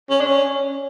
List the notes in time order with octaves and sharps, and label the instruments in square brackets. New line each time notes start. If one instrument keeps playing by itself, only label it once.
[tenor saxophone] C#4
D4
C#4